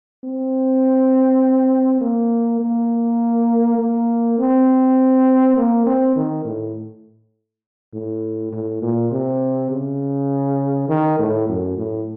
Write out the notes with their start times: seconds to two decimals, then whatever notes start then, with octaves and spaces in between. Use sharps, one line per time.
0.24 C4
2.01 A#3
2.61 A#3
3.79 A#3
4.39 C4
5.57 A#3
5.87 C4
6.16 D#3
6.45 A2
7.93 A2
8.53 A2
8.82 A#2
9.12 C3
9.71 C#3
10.89 D#3
11.19 A2
11.49 F#2
11.78 A2